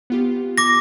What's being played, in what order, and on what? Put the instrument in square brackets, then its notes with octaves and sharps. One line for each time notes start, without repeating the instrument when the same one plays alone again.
[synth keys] B3 F4 G4
[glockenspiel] D6 A#6